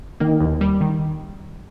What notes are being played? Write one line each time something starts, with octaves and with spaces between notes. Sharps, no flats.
D#3 A#3
D#2
G3
D#3